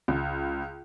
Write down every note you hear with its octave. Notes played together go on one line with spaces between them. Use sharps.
C#2